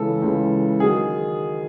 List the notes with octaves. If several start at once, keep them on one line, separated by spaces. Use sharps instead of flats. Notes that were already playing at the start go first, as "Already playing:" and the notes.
Already playing: C#2 C#3 E3 A4
C#2 C#3 E3
D#3 F#3 G#4